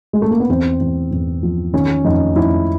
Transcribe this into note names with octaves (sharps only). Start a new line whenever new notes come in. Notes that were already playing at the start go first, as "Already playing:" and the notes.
G#3
A3
A#3
B3
E2 C4
E2
E2
F3
D#3 C#4
F2 D#4
F2 E4